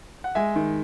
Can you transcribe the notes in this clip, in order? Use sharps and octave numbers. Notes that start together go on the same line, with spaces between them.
F#5
G#3 E5 G#5
D#3